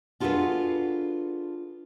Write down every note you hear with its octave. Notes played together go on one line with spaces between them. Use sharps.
D4 F4 F#4 G#4 A4 B4